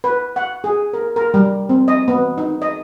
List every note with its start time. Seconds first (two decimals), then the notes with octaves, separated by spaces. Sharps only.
0.04 B4
0.36 F#5
0.64 G#4
0.93 A#4
1.16 A#4
1.34 G3
1.69 C4
1.88 D#5
2.08 B3
2.38 D#4
2.62 D#5